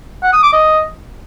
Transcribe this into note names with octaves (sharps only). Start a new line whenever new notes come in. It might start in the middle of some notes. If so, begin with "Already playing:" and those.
F#5
D#6
D6
D#5